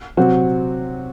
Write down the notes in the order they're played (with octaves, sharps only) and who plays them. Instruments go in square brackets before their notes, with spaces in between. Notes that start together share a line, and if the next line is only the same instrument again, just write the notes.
[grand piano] C3 F#3 C4 F#4